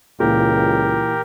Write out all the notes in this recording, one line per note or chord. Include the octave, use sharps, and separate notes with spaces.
C#2 A#2 E3 G4 A#4